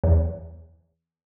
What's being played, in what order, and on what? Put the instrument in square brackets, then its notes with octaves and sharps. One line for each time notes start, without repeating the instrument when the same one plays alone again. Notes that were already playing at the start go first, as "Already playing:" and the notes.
[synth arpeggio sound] E2